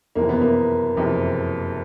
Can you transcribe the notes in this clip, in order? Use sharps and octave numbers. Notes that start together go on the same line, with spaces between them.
F#1 F2 C3 E3 A#3
B3
A#3
F#1 F2 C3 E3